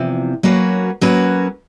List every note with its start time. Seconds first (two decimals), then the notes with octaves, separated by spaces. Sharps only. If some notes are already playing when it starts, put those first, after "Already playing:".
Already playing: E2 C3 F3
0.43 F#3 A#3 C#4 F#4 B4
1.01 F#3 A#3 C#4 F#4 B4